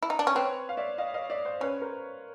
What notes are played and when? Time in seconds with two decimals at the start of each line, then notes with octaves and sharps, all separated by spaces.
0.03 E4
0.10 D#4
0.19 D4
0.27 C#4
0.35 C4 B4 C#5
0.69 F5
0.77 D5 E5
0.98 D#5 F5
1.14 D#5 F5
1.30 D5 E5
1.45 C5 D5
1.61 C#4 B4 C#5
1.82 A#4 C5